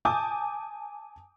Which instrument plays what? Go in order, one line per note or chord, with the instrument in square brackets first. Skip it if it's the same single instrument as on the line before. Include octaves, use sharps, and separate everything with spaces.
[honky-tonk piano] G#5 A5 D6 D#6 G6